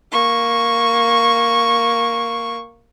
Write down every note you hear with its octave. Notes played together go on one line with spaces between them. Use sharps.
A#3 C#6